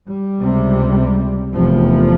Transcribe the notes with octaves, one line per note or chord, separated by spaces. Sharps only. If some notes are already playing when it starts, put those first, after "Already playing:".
G3
C#2 C3
F1 E2 C3 F3